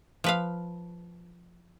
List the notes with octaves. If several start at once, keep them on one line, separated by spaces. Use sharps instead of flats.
F3 B4 F5